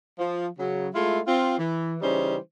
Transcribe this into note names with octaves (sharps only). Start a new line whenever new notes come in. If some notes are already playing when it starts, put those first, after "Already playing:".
F3
C#3 F#3
G#3 A3 E4 F4
C4 F4
E3
C#3 E3 G3 C#4 D#4 C5